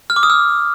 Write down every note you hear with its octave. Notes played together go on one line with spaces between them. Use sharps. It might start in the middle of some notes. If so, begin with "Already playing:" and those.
F6
D6
D#6
E6